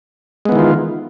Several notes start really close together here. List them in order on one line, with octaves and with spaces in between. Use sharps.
G#3 B3 E3 D#3 F4